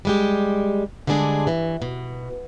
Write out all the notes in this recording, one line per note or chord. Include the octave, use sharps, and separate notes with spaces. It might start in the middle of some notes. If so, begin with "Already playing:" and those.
G3 G#3 G4
D3 G3 G#3 D4 G#4 A4
G2 E3
B2